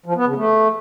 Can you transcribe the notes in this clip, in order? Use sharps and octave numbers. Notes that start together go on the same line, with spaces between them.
F3
B3
C#3
A3